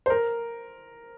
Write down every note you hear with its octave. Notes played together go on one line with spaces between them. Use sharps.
C5
A#4